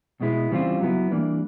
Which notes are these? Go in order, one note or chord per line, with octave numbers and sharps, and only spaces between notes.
B2 G#3 B3 E4
C#3 E3 G3 C4 F4
F#3 B3 E4
E3 G3 A#3 D4